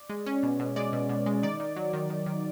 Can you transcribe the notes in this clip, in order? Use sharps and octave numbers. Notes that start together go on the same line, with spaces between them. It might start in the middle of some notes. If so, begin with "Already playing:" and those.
Already playing: D5
G#3
C#4
B2
B2
G#3 D5
B2
B2
G#3
D#3 D5
D#3
F#3
D#3
D#3
D#3